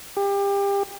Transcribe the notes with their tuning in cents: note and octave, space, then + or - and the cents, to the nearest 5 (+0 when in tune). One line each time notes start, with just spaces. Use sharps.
G4 +30